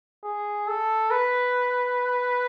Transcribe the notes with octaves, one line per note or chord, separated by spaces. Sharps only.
G#4
A4
B4